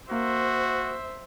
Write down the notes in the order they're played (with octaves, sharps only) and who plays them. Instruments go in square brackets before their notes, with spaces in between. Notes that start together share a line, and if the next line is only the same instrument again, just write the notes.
[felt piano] A#3 [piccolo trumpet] F#4 [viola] C5 E5